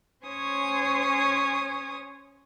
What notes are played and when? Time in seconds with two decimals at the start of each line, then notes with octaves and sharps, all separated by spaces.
0.25 C#4 C5 C#5 G#5 D#6